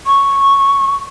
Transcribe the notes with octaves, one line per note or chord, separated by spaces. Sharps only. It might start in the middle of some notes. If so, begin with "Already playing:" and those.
C#6